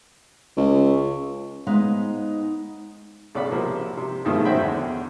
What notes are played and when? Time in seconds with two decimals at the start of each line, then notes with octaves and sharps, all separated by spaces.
0.57 C#2
1.67 G#3 B3 D#4 G#4 C5 F5
3.35 B1 C#3 D5 F#5 B5
3.51 C3 F3 A#3
3.97 C3
4.25 G2 B2 D#3 F3 G#3 A3
4.45 C#4 F#4 C5 E5 G5 B5
4.59 E2 D3